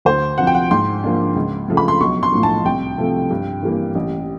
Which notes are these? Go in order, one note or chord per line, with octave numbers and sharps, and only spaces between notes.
D2 C5
C3 F3 F#5
G5
F#5
G#2 C6
F3 A#3 D4
C#2
C#3 F3 A3
B5
C6
B1 C#6
C6
A2 F3
A5
C2 G5
C3 F3 A3
G2
E3 G3 A#3
A1